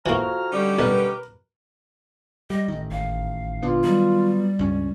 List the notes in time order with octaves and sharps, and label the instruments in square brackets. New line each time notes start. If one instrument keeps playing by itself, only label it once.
[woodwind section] F2 A#5 F6 [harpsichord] E3 A#3 [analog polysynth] F#4
[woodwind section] D3 G3 [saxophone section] C#4 D#4 G4
[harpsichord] B1 [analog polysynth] A#4 B4
[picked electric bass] G3 [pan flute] D#5
[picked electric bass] A1 D#3
[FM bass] G#1 [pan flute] F5
[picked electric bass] A#2 D3 B3 [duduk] F4
[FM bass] D#3 [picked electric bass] F#3 B3 [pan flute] G3
[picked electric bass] C#2 C#4 [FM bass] G2